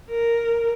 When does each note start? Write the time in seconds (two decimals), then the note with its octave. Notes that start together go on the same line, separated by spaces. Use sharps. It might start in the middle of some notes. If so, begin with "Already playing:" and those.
0.10 A#4